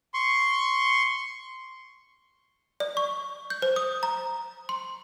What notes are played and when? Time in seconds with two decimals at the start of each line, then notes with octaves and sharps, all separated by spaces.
0.14 C6 C#6
2.80 D5
2.97 C#6
3.50 G6
3.62 C5
3.76 D#6
4.03 A#5
4.69 C6